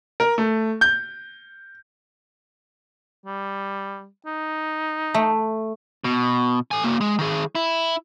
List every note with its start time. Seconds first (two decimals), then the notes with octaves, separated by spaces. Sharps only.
0.20 A#4
0.38 A3
0.81 G6
3.26 G3
4.26 D#4
5.14 A3
6.04 B2
6.71 A4 G#5
6.84 A#3 F#4
7.01 G#3
7.19 D#3 G#4
7.55 E4